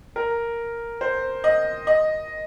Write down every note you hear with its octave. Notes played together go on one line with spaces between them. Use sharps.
A#4
C5
D#5
D#5